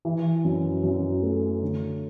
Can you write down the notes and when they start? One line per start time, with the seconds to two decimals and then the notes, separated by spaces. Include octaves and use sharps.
0.05 E3
0.45 F#2
0.83 F#2
1.22 A3
1.62 D3